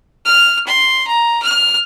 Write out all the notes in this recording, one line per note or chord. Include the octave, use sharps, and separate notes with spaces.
F6
C6
A#5
F6